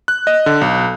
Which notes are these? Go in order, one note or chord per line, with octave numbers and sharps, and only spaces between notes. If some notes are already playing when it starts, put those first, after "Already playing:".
F#6
D#5
D3
B1